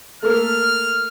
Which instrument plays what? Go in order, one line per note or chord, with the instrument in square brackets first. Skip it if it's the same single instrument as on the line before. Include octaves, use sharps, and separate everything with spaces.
[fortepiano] A3 A#3 A4 [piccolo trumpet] F6